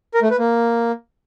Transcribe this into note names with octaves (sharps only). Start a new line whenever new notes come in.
A#4
A3
B4
A#3